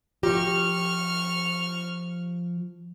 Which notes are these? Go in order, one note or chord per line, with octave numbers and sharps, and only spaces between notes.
F3 F4 G4 C#6 F6